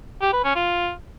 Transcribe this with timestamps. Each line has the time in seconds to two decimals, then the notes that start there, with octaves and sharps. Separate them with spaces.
0.21 G4
0.33 B4
0.44 C#4
0.56 F4